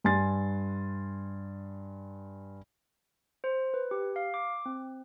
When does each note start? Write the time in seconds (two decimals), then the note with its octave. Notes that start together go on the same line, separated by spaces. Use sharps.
0.04 G2 G#5 C6 A6
3.44 C5
3.74 B4
3.91 G4
4.16 F5
4.34 D6
4.66 C4